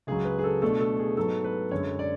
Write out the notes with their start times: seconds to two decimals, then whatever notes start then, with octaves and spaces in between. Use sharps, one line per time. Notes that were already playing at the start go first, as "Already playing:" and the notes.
0.07 C#2 C#3 F#3 G#4
0.25 B4
0.39 G#4
0.44 A4
0.62 B2 A3 D4 A4
0.80 A4
0.99 G#4
1.17 G#2 F#3 B3 A4
1.44 B4
1.71 F#2 D3 G#3 C#5
1.99 D5